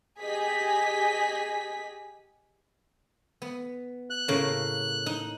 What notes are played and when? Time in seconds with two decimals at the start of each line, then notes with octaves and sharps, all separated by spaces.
0.21 G4 G#4 D#5 G#5 B6
3.42 B3
4.10 F#6
4.28 A2 C#3 A#3
5.06 D#4